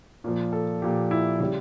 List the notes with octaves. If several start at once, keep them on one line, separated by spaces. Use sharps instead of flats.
A#2 F3
A4
A#2 F3 G4
E4
C#3 G3 E4